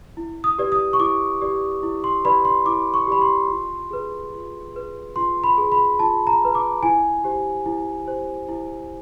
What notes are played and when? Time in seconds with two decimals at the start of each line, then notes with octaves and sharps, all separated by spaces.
0.17 E4
0.44 D#6
0.58 G4 B4 D5
0.72 D#6
0.93 C#6
1.00 E4 D6
1.41 G4 B4 D5
1.83 E4
2.04 C6
2.24 G4 B4 D5 B5
2.45 C6
2.66 E4 D6
2.94 C#6
3.07 G4 B4 D5 B5
3.22 C6
3.49 F4
3.91 G#4 B4
4.33 F4
4.75 G#4 B4
5.16 F4 C6
5.44 B5
5.58 G#4 B4
5.72 B5
5.99 F4 A5
6.27 A#5
6.41 G#4 B4
6.55 D6
6.83 E4 G#5
7.24 G4 C5
7.66 E4
8.07 G4 C5
8.49 E4